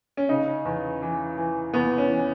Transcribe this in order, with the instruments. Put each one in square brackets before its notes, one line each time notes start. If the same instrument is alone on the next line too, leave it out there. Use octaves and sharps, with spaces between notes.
[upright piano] C#4
C#3 D#4
E2
E3
E3
E2 B3
C#4
E3